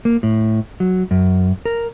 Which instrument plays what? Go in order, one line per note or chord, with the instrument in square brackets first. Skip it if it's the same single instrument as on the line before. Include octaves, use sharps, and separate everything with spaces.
[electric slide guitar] A#3
A2
F#3
F#2
A#4